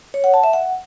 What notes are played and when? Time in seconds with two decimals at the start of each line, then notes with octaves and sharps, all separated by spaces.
0.14 C#5
0.24 F#5
0.34 A5
0.44 E5
0.53 F#5